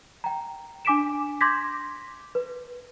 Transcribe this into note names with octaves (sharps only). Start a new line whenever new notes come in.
G5 A#5
D4 G#5 D6 B6 D7 E7
C6 D6 G6 G#6 A#6 B6
B4